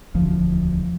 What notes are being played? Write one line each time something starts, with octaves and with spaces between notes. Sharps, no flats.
E1 D2 F3